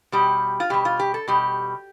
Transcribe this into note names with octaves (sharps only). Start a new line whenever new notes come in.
B2 G3 G4
F4
B2 G3 G4
F4
G4
A4
B2 G3 G4